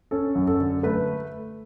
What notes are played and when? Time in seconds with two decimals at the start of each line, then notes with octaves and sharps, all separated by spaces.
0.11 C#4 A4
0.35 F#2
0.47 A4
0.60 D3
0.83 A3 B4